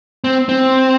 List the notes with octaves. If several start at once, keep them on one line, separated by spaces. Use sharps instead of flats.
C4
C4